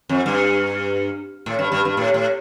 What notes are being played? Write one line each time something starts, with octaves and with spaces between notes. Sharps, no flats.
F2
G2
A2
G2
G2
G2
A2
A2